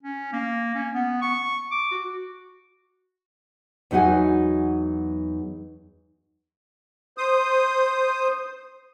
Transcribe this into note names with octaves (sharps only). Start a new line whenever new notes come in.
C#4
A#3
C#4
B3
C#6
D6
F#4
E2 F#3 D#4 F#4 F#5 G#5
C5 D#6